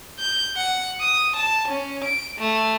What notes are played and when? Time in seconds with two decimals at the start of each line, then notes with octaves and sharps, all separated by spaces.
0.19 G6
0.57 F#5
1.01 D#6
1.36 A5
1.68 C#4
2.05 D7
2.39 A3